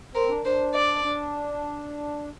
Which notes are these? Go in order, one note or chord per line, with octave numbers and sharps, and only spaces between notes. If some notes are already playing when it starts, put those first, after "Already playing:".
C4 A#4
D4
D4 C5
D5
D4